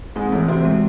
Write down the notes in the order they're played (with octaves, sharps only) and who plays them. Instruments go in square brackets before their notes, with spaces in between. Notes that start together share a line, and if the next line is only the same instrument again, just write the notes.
[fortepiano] G#2 G#3 [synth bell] C4
[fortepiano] A2 A3 [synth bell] E3
[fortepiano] C3 C4 [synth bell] F#4
[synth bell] G#3